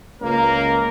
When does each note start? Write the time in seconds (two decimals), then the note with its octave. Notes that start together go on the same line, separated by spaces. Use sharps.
0.22 C#2 A#3 A#4